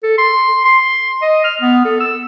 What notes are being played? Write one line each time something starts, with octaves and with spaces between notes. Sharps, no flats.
A4
C6
C6
D#5
F6
B3
A4
E6